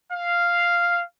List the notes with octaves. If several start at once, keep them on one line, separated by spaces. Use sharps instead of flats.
F5